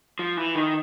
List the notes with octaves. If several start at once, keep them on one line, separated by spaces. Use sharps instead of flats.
F3
E3
D#3